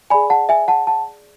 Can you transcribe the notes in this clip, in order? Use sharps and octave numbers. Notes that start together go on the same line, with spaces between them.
G#4 D5 G#5 B5
F#5 A5
E5 G#5
F#5 A5
F#5 A5